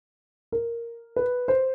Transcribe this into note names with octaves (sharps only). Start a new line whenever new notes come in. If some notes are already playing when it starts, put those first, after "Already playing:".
A#4
B4
C5